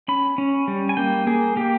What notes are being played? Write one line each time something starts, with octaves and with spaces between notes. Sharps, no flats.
C#4 B5
C#4
G3
G#5
A#3 G5
A#3 G#4
A#3 G4